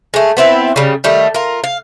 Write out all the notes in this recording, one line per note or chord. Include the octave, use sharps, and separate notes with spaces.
G#3 A3
B3 C4 E4 B4
C#3 G3
D#3 G3 A3
F4 A#4
F5